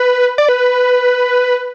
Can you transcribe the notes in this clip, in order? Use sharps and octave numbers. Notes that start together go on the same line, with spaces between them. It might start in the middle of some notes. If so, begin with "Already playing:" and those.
Already playing: B4
D5
B4